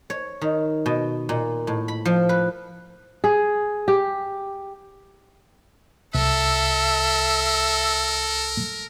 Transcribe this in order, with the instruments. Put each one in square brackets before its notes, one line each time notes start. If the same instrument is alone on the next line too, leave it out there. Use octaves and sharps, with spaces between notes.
[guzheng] C#5
D#3
B2
A#2
A2
B5
F3
B4
[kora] G#4
G4
[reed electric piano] C2 [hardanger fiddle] A4 [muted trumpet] A#4 [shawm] E5